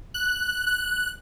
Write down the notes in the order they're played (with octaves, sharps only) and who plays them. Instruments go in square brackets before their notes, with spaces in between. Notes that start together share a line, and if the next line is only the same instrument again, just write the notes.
[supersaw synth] F#6
F#6